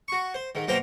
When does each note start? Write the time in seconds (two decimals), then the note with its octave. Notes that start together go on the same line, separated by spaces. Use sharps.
0.08 F#4 C#6
0.34 C5
0.55 G#2 D#3
0.68 F#2 B2 A#3 C5 G5 A#5